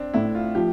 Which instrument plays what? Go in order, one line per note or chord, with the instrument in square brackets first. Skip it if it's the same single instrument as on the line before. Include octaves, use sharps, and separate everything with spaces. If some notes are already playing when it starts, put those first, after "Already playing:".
Already playing: [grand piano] C4 D4
[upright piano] A2 [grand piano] E4
[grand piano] F4
[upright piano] F3 [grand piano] G4